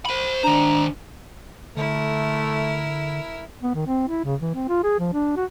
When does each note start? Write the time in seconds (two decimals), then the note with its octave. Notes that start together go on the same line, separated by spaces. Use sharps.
0.06 C5 B5
0.43 D#3 D4 C5 A#5
1.77 D3 A3 E4 A#4
3.63 B3
3.74 D#3
3.86 C4
4.08 E4
4.24 C#3
4.40 E3
4.55 C4
4.68 F4
4.84 G#4
4.99 F3
5.13 D4
5.37 F#4